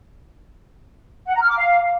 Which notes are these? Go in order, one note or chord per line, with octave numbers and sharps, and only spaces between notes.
F#5
A#5
F6
D6
F5